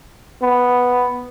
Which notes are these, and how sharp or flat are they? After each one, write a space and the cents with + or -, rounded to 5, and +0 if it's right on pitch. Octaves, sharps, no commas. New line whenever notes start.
B3 +0